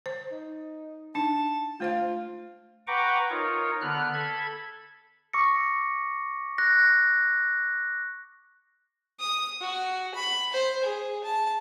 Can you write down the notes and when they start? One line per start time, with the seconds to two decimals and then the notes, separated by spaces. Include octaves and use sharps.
0.06 C5
0.32 D#4
1.15 D4 D#4 A5
1.80 A3 F4 C5 F5
2.87 B4 F#5 G5 A#5 C#6 D6
3.30 D#4 F4 A#4 C#5
3.81 D3 B3 F6 F#6
4.14 A4 B5 G#6
5.33 C#6 D6 E6 A#6 C#7
6.58 F#6 A#6
9.20 D#6
9.61 F#4
10.15 B5
10.53 C5
10.84 G#4
11.24 A5